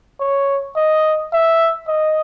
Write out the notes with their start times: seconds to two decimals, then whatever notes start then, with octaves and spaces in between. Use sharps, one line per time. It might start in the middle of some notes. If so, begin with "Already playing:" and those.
0.20 C#5
0.76 D#5
1.32 E5
1.88 D#5